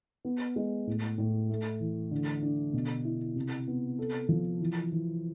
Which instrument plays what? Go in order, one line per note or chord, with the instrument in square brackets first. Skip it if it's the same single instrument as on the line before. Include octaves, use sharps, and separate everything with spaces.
[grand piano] B3
G#3
A2
A2
A3
E3
D3
D4
B2
E4
C3
B3
A4
F3
E3
E3